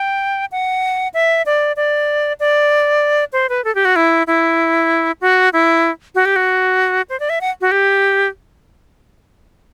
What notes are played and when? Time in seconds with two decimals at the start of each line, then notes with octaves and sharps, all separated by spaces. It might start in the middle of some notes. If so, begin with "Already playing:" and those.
Already playing: G5
0.52 F#5
1.14 E5
1.46 D5
1.76 D5
2.40 D5
3.33 C5
3.49 B4
3.64 A4
3.75 G4
3.85 F#4
3.96 E4
4.27 E4
5.21 F#4
5.53 E4
6.15 F#4
6.25 G4
6.36 F#4
7.09 C5
7.20 D5
7.30 E5
7.41 F#5
7.61 F#4
7.71 G4